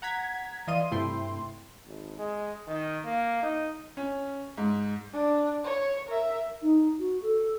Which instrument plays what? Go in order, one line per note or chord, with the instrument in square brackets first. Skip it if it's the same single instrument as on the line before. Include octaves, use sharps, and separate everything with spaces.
[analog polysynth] F#5 A#5 G#6 B6
E3 D5 D#5 F5 C6 D#7
G2 C3 A3 E4 G5 C6
[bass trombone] G#1
G#3
D#3
A#3
D#4
[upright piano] C#4
G#2
[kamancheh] D4
C#5
A#4 E5
[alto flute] D#4
F#4
A4